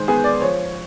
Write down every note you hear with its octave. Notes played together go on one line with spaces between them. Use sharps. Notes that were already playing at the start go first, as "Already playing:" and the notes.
Already playing: D#3 G#3 C5
B3 G#4
D5
F3 C#5